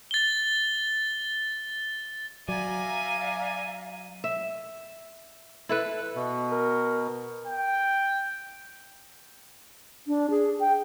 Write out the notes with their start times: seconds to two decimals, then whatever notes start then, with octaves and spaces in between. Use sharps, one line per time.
0.11 A6 G7
2.48 F#3 D5 E5 F5 G#5 A#5
4.24 E5
5.69 E4 A4 B4
6.16 B2
6.52 A#4
7.47 G5
10.07 D4
10.30 G#4
10.60 G5